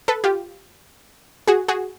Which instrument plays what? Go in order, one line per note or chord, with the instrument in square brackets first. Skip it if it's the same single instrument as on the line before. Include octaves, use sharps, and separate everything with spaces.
[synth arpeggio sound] A4 B4
F4 G4
F#4 G#4
F#4 G#4